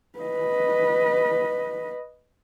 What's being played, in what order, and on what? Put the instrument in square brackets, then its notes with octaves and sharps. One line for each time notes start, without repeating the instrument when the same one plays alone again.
[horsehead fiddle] B4 D#5